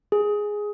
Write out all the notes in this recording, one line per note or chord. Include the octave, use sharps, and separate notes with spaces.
G#4